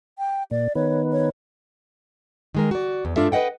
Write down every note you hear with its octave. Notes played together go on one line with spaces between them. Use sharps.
G5
A#2 D5
D#3 B3 C#5
C#5
D#3 G#3 A#4
F#4 D5
E2
G2 G#3 D4 F4 A4 E5
B4 C5 D#5 F#5 G5